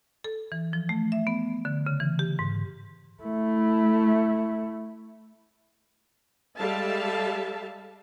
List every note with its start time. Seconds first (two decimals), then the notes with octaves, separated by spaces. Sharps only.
0.24 A4
0.52 E3
0.73 F3
0.89 A3
1.12 E5
1.27 B3
1.65 D3
1.87 C#3
2.00 E3
2.19 G4
2.39 G#2
3.23 A3 E4
6.58 G3 G#3 A4 E5 F5 A5